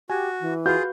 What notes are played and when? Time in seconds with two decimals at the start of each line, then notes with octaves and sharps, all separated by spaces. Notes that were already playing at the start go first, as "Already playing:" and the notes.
0.10 F#4 G4 G#5
0.41 E3
0.66 F4 F#4 G#4 B4 F5 G6